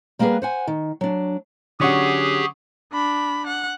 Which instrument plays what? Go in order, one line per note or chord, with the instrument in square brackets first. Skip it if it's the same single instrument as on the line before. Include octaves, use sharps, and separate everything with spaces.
[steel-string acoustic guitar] G3 A#3 B3 G4 G#4 B4
C5 F#5 G#5
D#3
F#3 D4
[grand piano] D3 F#3 C#4 [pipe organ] G4 G#4 [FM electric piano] F#5 C#6 D#6
[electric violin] D4 B5
F#5